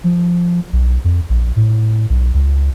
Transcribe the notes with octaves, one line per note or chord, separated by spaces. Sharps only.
F3
B1
F2
A#1
A2
B1
C#2